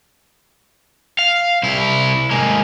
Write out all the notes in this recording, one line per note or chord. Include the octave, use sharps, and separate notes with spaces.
F5
C2 E4
G#3 A#3